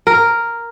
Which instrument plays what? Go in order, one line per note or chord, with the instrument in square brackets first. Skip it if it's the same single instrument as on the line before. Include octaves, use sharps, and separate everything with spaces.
[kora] A#4